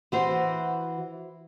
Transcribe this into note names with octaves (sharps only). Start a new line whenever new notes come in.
E3 F#4 C5